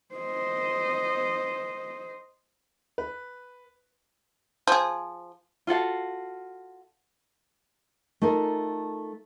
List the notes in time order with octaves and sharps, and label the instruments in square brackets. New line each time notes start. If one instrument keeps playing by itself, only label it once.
[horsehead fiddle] C5 D#5
[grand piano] B4
[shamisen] F3 G#4
[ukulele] F4 F#4 A4 F5
[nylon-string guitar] A3 D#4 F4 A#4